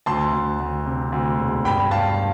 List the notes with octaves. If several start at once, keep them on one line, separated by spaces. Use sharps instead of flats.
D2 A5 C6
D2
D2
C3
D2
E1
G2 G5 B5
G2 F5 A5